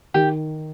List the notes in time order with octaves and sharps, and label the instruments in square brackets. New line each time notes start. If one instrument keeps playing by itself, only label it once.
[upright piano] D#3 [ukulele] G4